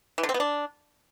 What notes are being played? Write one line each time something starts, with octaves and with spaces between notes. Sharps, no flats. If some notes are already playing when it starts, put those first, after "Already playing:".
E3
D3
C4
B3
D4